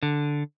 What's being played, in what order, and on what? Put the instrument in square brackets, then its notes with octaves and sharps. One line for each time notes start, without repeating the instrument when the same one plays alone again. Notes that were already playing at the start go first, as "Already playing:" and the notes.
[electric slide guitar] D3